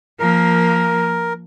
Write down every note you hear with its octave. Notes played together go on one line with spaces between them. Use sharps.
F3 A#3 A#4